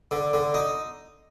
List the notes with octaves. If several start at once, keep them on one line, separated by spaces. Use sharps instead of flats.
D3
D3
D#4